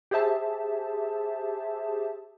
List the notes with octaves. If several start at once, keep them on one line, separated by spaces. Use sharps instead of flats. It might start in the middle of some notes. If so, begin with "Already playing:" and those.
G4 G#4 C5 E5 A5